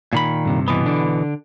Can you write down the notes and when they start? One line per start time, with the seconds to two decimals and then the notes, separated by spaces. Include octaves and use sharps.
0.13 A#2 D#3 B5
0.45 G2 C3
0.68 B2 E3 B3
0.86 D3 D4